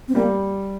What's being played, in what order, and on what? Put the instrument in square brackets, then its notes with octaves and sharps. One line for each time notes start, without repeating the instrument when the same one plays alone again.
[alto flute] C4
[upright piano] G3 [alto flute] A#3